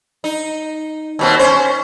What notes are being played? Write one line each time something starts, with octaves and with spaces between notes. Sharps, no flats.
D#4
D#2 B2 C4
C#4 C5